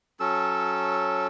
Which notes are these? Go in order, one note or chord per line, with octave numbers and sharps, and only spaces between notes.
F#3 C#4 A4 E6